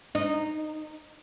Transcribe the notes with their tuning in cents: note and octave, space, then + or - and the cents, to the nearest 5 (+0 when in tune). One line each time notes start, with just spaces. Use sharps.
D#4 -15